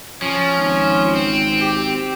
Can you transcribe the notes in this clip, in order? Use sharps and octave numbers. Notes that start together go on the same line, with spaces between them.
F3 C#4
G#1
C4
G4